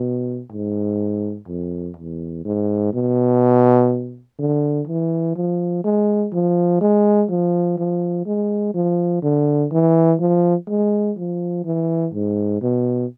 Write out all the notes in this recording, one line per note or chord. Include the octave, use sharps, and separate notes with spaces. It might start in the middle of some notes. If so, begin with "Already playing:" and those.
Already playing: B2
G#2
F2
E2
G#2
B2
D3
E3
F3
G#3
F3
G#3
F3
F3
G#3
F3
D3
E3
F3
G#3
F3
E3
G#2
B2